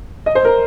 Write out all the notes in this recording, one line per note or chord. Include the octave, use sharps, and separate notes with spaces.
D#5
C5
A#4